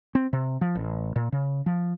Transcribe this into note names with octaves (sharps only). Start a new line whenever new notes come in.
C4
C3
F3
A1
A#2
C#3
F3